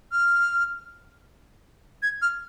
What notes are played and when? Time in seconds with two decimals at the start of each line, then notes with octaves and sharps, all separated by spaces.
0.12 F6
2.03 G#6
2.22 F6